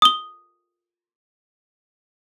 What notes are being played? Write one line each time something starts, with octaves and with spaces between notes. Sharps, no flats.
D#6 G7